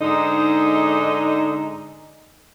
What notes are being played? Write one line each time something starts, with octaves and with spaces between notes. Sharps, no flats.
G#2 D3 D#4